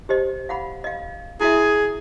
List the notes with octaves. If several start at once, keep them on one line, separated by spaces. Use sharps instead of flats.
G4 C5 D#5
F5 F#5 B5
D#5 F5
E4 F#4 G#4 E5